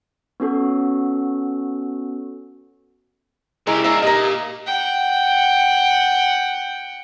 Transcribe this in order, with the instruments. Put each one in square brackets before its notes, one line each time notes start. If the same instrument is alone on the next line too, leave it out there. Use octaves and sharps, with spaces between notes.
[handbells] B3 C#4 F#4 A4
[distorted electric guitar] C#3 G4 [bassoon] G#3 [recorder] E4 [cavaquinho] A#4 E5
[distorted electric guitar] A#3 D4 [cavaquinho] E5 A#5
[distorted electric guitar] A#2 [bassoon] D#4 [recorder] G4 [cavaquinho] A#4 D#5
[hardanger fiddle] F#5 G5